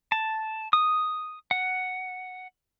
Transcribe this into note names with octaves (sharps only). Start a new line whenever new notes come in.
A5
D#6
F#5